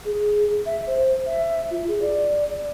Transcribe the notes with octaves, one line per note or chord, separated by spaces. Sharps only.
G#4
E5
C5
E5
F4
G#4
D5